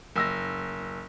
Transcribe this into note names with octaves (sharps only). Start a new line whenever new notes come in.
F#1 E6 A#6